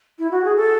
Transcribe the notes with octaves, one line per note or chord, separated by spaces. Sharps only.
E4
F#4
G#4
A4